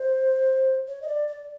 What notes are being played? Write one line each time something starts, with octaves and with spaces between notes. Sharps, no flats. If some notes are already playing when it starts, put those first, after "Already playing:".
Already playing: C5
C#5
D#5
D5
D5